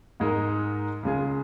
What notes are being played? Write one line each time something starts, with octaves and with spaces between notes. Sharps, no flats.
G#2 G#3 D#4 A#4
C#2 C#3 G#3 F4 G#4